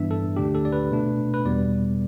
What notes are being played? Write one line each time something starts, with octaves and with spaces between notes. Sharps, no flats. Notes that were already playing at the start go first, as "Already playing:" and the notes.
Already playing: G2 E3 B3 D4 E5
A4
D2 D3 A3 D4 G4
A4
D5
B4
B2 A3 D4
B4
E2 B2 G3 B3 D5